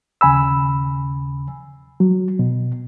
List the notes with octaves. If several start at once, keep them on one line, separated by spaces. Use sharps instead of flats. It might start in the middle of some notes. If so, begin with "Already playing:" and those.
D#2 C#3 G#5 B5 E6
F#3
B2